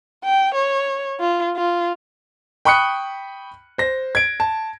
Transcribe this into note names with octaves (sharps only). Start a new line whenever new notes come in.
G5
C#5
F4
F4
G5 B5 C#6 D#6 F#6 C#7
C5 A#6
G#6 D7
A5